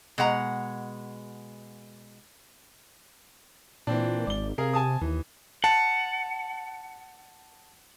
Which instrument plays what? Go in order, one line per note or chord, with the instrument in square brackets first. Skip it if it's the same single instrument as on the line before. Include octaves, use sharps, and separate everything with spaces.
[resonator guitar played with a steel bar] B2 G#3 F#5 A#5
[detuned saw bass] A#2 [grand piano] E3 C4 D4
[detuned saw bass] G#1 [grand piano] D5 G7
[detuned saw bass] C3 [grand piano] G#4 A#4 F5
[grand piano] G#5 A5 D#6
[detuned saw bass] D#2 [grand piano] E3
[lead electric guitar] F#5 [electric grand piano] A5